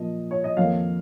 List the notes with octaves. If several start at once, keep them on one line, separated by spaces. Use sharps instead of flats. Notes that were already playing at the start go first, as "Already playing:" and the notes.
Already playing: A#2 F3 A#3 D#5
C#5
D#5
F2 D#3 A#3 C#5 F5